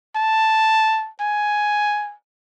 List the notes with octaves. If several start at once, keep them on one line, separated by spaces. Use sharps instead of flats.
A5
G#5